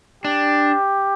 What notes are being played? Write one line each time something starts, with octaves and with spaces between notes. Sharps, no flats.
D4 G4